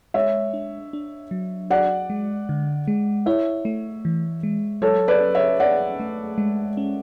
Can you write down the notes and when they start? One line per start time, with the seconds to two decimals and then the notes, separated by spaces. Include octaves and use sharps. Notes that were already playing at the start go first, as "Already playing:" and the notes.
0.14 G#3 C#5 E5
0.53 D4
0.93 D4
1.31 F#3
1.70 F#4 D5 F#5
2.10 G#3
2.49 D3
2.88 G#3
3.26 E4 C#5 E5
3.65 A3
4.05 E3
4.43 G#3
4.82 F#3 A4 C#5
5.08 B4 D5
5.21 C#4
5.35 C#5 E5
5.60 G#4 D5 F#5
6.00 A3
6.38 G#3
6.77 C#4